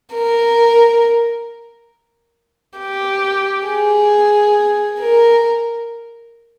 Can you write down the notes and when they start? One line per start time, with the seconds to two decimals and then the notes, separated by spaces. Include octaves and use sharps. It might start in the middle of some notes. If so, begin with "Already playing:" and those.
0.14 A#4
2.79 G4
3.67 G#4
5.00 A#4